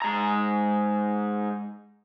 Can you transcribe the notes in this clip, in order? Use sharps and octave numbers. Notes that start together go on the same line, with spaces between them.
G#2 A#5